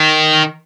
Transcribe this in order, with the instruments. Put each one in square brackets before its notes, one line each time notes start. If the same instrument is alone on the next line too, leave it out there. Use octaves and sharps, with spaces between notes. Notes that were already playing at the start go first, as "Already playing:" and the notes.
Already playing: [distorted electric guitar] D#3